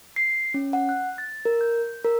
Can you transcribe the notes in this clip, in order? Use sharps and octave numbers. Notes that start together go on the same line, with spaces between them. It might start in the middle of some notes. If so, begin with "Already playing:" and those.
C7
C#4
F#5
F#6
A6
A#4
G6
A#4